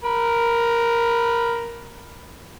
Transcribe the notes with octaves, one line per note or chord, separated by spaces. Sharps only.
A#4 B5